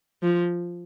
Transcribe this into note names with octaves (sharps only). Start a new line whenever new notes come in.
F3